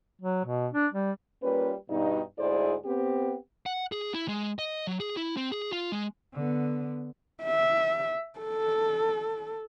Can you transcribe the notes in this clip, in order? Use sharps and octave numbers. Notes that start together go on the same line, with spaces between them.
F#3
B2
D4
G3
G3 A#3 C#4 F4 B4
G2 B2 D#4
D2 G#2 E4 G#4 C5 D5
B3 C4 G4
F#5
G#4
E4
G#3
D#5
F#3
G#4
E4
C4
G#4
F4
G#3
D3 B3
E5
A4